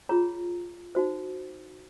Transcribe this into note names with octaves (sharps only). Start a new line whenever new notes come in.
F4 G#4 C#5 A#5
D#4 F#4 C5